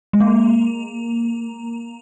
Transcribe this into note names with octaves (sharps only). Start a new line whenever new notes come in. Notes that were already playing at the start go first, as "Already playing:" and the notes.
G#3
A#3